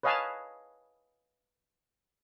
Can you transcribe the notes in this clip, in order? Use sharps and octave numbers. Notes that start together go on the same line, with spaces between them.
B4 C#5 D#5 F5 G#5 A5